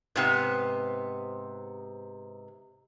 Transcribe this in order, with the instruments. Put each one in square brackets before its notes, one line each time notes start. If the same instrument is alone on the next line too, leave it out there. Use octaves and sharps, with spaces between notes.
[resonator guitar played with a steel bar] G#2 C3 B3